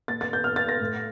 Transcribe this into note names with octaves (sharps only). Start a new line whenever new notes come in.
A#2 A6
A6
G6
F6
A6
A#6
A2